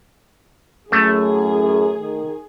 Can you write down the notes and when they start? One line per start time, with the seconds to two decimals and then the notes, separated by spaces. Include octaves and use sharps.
0.92 F#2 A2 A3 G#4
1.99 D#3